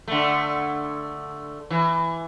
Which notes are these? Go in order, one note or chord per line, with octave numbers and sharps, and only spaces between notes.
D3 A3
E3